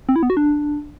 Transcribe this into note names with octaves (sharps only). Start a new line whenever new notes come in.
C4
E4
B3
F#4
D4